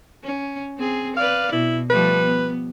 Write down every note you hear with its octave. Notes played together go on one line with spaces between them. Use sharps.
C#4
C4 G#4
B4 D5 F5
B2 E4
F3 G3 A3 B4
B3